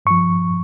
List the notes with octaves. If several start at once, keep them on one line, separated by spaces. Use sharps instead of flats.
G2 F3 C#6